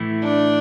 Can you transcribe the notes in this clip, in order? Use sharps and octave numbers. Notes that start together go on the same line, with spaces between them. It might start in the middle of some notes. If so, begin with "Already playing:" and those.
Already playing: A2 E3 A3 E4
D4